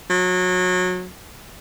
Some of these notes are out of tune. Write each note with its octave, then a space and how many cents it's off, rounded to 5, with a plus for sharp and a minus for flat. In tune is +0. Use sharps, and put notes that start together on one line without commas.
F#3 -25